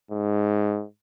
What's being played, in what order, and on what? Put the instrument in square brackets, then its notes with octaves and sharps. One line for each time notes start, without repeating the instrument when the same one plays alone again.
[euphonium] G#2